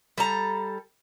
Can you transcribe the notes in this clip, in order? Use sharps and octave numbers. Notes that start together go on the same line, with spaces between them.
G3 A4 A#5